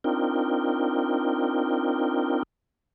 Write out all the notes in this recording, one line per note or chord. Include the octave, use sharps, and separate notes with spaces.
C4 D4 D#4 F4 A#4 G5